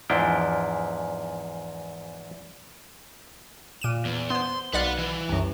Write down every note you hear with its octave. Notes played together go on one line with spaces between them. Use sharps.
E2 G#2 F3 D4 E4 G5
A#2 D#7 E7
E2
B3 C5 C6
B1 B4 D5 F5 F#5
E3
C2 F#2